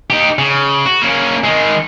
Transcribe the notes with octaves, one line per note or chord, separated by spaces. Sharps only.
D#4 G4
C#3
F#4
A#3 C#4
D#3 G#3